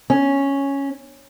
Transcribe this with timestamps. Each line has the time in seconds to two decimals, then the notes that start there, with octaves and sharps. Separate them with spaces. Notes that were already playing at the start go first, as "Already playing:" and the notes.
0.10 C#4